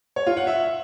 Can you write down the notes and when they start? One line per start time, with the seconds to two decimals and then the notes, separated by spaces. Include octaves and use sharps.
0.16 C#5
0.27 F4
0.37 F#5
0.47 E5